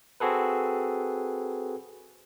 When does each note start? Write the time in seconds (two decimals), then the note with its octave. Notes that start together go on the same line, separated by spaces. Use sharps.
0.20 C4 F#4 G#4 A4 B4